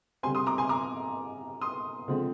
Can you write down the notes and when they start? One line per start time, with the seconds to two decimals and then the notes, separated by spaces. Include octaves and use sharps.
0.23 D3 G3 C4 G#5 C6
0.35 C6 D#6
0.46 A#5 D6
0.58 G#5 C6
0.69 A#5 D6
1.61 C6 D#6
2.08 D3 F3 G#3 C4